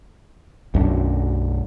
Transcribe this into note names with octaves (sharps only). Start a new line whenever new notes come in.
B1 F#2 D4